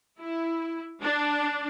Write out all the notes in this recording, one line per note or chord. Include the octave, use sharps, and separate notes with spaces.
E4
D4